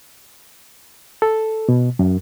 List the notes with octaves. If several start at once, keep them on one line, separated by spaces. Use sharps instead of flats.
A4
B2
F#2